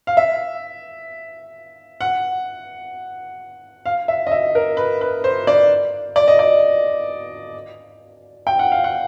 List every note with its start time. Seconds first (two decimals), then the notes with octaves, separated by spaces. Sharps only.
0.07 F5
0.17 E5
2.01 F#5
3.86 F5
4.08 E5
4.27 D#5
4.31 E5
4.55 A#4
4.77 B4
5.01 B4
5.24 C5
5.47 D5
6.16 D5
6.28 D#5
6.39 D5
8.47 G5
8.59 F#5
8.72 F5
8.84 F#5